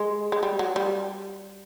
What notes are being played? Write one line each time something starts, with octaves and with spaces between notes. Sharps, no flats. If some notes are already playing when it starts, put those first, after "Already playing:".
Already playing: G#3
G#3
G3
F#3
G3